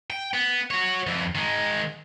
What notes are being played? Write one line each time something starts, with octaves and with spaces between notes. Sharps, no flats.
G5
B3
F#4 C#5
F2 E3
D#3 G#3